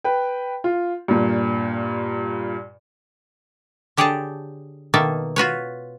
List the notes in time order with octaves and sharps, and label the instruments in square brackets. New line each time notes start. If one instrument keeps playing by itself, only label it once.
[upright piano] B4 G5
F4
G2 A#2
[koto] D3 G4 G#4 C#5 G5 A5
B2 D#3 A#3 A4 E5
F4 F#4 B4 C#5